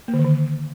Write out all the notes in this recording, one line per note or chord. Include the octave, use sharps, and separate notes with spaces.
A#3
D3
D#3
D3